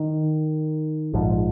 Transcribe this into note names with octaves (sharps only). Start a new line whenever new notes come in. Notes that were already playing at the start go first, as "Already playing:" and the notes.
Already playing: D#3
A#1 G#2 F3